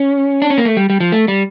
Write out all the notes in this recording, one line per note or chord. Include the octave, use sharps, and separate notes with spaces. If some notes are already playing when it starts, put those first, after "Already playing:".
Already playing: C#4
D4
C#4
A#3
A3
G3
G3
F3
A3
G3